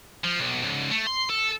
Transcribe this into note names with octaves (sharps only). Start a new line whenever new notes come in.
F3
B1
C#2 G#2
A3
C6
A4